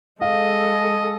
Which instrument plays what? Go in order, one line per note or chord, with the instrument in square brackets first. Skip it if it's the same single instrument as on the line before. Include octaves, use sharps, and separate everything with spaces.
[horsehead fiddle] G#3 A4 [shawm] D#5 [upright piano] F5